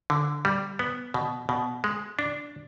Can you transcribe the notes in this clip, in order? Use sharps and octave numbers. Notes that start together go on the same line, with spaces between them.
D3
G3
B3
B2
B2
G#3
D4